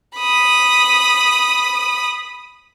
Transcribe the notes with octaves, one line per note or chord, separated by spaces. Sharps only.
B5 D#6